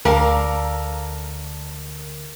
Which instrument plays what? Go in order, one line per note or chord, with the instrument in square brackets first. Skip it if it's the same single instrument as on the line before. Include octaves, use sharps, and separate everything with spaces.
[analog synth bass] D2 [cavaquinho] A4 D5 F5 [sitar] A#4